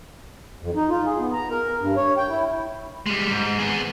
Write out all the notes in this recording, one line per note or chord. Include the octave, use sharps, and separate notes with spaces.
F2
D#4
F4
G#4
B3
A#5
A#4
G2
C#5
G5
E4
G3 G#3
G#2
B3 G#4